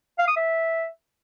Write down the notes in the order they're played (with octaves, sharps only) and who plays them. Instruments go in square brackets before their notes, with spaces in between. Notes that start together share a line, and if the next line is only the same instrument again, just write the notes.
[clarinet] F5
D#6
E5